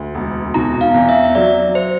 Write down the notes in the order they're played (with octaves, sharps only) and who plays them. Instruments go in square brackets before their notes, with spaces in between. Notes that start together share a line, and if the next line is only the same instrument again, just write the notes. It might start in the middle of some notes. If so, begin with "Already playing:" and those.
Already playing: [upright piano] D2
E1
[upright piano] B2 [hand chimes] A#5
[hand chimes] F5
[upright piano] E2
[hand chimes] E5
[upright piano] F#3 [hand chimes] D5
[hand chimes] C5